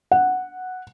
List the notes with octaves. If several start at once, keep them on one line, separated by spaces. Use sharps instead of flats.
F#5